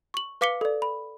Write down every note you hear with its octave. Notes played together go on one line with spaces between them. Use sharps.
C#6 F#7
B4 F5 D6 B6 C#7 G7
A4 D5
B5